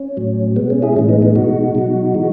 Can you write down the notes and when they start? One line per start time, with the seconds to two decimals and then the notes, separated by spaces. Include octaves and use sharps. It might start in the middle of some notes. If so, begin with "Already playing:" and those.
Already playing: C#4
0.17 A2 F#3
0.56 B2 G#3 B3
0.70 C#4
0.82 E4 G#4
0.96 A2 E3 G#3 C#4
1.09 B3 D#4
1.22 B3 D#4
1.35 B2 G#3 D#4 F#4
1.75 B2 F#3
2.14 E3 G#3